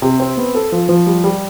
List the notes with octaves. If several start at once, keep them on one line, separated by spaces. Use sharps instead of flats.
C3
C4
B3
A4
F3
F3
G3
G3